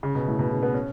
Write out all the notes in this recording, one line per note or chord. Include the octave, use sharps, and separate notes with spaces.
C#3
B2
A2
B2
C#3
B3
C#4